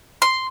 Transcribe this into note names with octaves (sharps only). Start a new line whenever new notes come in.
C6